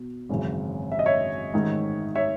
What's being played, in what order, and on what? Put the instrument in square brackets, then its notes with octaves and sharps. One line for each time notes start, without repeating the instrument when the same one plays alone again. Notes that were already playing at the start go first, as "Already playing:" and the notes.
Already playing: [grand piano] B2
G#1 F#2 C#3 E3
E5
D#5
C#5 E5
A1 G#2 D#3
C#5 E5